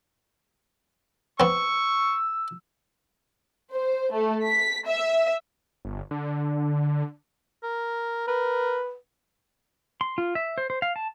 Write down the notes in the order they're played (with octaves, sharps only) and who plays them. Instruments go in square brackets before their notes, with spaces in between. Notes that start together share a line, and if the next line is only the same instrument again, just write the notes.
[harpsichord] B3 C4 [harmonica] C#6 [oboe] E6
[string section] C5
A3
B6
E5
[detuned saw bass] G1
D3
[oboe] A#4
[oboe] A#4 [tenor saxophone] B4
[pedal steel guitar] C6
F4
E5
C5
C5
F5
A5